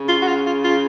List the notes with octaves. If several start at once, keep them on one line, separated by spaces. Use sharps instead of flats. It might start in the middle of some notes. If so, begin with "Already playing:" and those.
Already playing: C#3
F4
F#4
F4
F4
F4